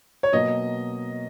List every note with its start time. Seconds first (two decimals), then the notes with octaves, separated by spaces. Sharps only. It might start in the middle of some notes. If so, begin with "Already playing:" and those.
0.23 C#5
0.32 B2 F#3 A#3 D#5